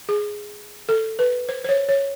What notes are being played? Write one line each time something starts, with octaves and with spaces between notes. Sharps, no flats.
G#4
A4
B4
C5
C5
C#5
C#5